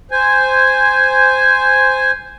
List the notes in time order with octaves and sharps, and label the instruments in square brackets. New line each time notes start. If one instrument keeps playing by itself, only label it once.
[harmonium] C5 G#5